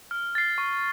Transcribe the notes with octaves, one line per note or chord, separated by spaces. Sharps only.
F6
A6 C7
C#6